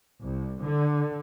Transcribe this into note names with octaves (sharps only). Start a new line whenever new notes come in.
C2
D3